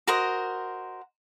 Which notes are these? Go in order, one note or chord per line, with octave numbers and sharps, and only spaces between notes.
F#4 A#4 C5 D#5